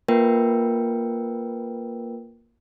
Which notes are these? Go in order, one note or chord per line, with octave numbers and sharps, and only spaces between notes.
A#3 F4 A#4 B4 G5